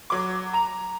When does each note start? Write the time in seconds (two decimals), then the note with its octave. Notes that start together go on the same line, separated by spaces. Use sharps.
0.10 F#3 D6
0.53 A#5 F7